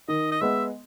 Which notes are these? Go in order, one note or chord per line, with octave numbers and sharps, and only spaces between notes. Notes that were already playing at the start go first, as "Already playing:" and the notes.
D#3 D#5
D#5
G#3 B3 E5